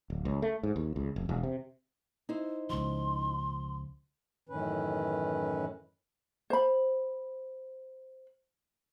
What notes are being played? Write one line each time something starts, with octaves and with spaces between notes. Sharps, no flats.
D1
C#2
A3
G#2
D#2
C#2
F1
E1
C3
D#4 E4 C5
C#2 F3 C6
F#2 A2 D#3 E3 C#4 B4
C5 B5